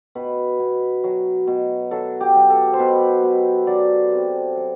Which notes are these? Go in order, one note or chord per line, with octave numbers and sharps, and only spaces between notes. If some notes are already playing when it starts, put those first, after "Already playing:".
B2 B4
B2
F#3
B2
F#3 A4
G4
F#3
A4
C5
B2 B4
B2
F#3 D5
C3
F#3